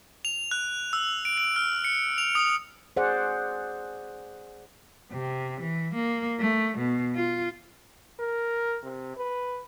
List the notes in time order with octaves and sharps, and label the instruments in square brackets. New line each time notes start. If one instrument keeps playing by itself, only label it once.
[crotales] F7
F#6
E6
D7
D7
F6
C#7
F7
D#6
[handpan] G#4 C5 D5 F#5
[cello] C3
E3
A#3
A3
B2
F4
[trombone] A#4
C3
B4